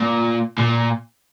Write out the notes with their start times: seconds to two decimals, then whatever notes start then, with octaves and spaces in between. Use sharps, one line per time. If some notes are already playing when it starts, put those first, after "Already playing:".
Already playing: A#2
0.58 A#2